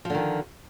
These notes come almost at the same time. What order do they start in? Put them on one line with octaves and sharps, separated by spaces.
F3 D3 D#3